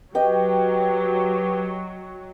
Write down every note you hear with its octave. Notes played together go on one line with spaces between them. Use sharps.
F#3 G4 B4 D#5 G5